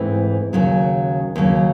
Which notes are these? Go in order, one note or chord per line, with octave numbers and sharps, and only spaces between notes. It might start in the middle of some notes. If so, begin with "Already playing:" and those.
Already playing: G#2 E3 A3 C4 E4
D#2 C#3 F#3
D#2 C#3 F#3